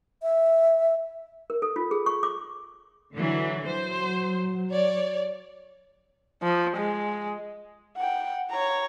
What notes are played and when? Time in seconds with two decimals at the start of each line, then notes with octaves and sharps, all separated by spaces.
0.22 E5
1.50 A#4
1.62 A4
1.76 F4
1.91 G#4
2.06 C#6
2.23 D6
3.14 D3 E3 F#3
3.64 F#3 C5
4.69 C#5 D5
6.42 F3
6.77 G#3
7.97 F#5 G5
8.50 C#5 A#5